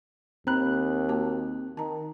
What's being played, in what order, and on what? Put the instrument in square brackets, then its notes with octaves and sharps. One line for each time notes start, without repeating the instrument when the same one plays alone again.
[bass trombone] D#2 [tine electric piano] C4 F#6 [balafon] A#5 B5
[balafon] A#3 F#4 A5
[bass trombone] D#3 [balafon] A5 A#5